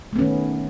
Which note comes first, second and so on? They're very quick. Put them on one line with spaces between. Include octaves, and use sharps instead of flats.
A3 B3 C#4 D#3